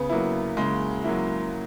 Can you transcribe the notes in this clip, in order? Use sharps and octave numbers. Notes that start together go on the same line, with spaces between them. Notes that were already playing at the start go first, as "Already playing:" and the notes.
Already playing: C#3 B3
F#3 A#3 E4
C#3 G#3
F#3 A#3 E4